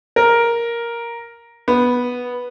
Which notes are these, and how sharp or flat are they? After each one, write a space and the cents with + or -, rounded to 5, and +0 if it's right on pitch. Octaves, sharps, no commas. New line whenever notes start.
A#4 +5
B3 -5